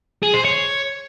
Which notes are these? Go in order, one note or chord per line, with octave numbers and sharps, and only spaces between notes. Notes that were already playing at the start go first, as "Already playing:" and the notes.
G#4
C5
C#5